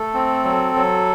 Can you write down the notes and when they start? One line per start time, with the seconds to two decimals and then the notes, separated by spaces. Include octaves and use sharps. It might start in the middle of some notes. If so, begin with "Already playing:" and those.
Already playing: A3 A4
0.14 C4
0.44 F#3
0.76 F#3